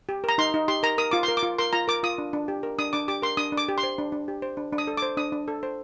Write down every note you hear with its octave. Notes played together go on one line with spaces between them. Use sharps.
G4
A#4 A#5
D#4 C6
D#4
G4 C6
A#4 A#5
A#4 D#6
F4 D6
C6
A#4
D6
F4
A#4 C6
F4 A#5
A#4 D6
F4 D#6
D4
D4
G4
A#4
D4 D#6
D4 D6
G4 D6
A#4 C6
D4 D#6
D4
D6
G4
C6
C5
D4
D4
G4
C5
D4
D4
D#6
A4
C5 D6
D4 D#6
D4
A4
C5